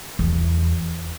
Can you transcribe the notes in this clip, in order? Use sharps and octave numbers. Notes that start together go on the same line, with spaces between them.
E2